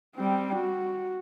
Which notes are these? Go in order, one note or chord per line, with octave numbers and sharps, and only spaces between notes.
G3 C4
F#4